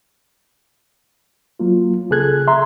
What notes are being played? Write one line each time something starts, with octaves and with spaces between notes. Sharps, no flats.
F#3 A#3 F4
C2 C#3 G#4 A4 F#6 G#6
E5 A#5 C6